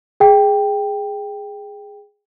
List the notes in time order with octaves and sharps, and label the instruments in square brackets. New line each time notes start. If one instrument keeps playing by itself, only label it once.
[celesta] G#4 G5